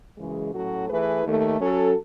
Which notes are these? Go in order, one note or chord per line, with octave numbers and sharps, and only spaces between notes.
F#2 C#3 E3 G#3
A2 F#3 A3 C#4 F#4
E3 A3 E4 G#4 B4
D#2 D#3 A3
F#3 C#4 F#4 A4